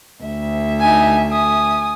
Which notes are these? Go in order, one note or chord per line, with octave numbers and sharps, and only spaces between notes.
D2 E5
D#4 G#5
G#5 D#6